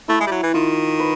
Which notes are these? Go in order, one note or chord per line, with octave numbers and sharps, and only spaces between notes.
A3 E4
G#3
G3
F#3
E3
D#3 F4
B4